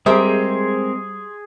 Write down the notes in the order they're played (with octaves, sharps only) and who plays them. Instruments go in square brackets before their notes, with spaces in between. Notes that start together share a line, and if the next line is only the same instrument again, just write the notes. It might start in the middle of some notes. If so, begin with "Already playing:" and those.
[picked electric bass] G3 [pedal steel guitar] G#3 C4 A#4 [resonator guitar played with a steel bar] G4 C5 E5 [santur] G#4